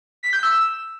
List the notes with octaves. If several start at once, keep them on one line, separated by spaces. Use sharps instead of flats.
B6
G6
E6